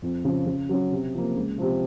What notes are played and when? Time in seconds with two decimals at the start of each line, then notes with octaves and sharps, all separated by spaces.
0.02 F2
0.24 C#3 F3
0.46 C#3
0.69 F#3 C#4
0.92 C3
1.14 F3 A#3
1.36 C#2
1.58 C3 F3